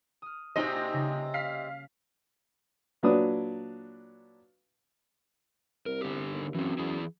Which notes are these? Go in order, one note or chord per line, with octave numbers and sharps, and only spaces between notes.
D#6 F6
A#1 C3 A#3 D#4 F#4 C5 D#5
C#3 G3
F5 B6 C7
A#2 F#3 D4 B4 D#6
C2 A#4
D3 G4
D#2
F#2 E3 C4
E3 E4 G#4